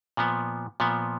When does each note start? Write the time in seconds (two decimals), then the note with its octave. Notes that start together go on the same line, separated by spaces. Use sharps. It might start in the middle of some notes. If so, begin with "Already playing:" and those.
0.17 A#2 F3 B3
0.80 A#2 F3 B3